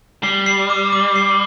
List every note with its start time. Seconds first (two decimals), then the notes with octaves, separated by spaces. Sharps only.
0.23 G3 C7
0.46 C7
0.70 D6
0.92 D6
1.16 C7